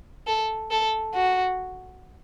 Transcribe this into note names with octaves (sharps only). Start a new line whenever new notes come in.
A4
A4
F#4